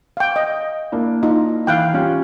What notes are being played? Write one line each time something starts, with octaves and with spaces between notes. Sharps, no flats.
F5 G5
D#5
A#3 D4 E4
D#4 F4
E3 E4 F5 G5 F#6
G3 C#4 F4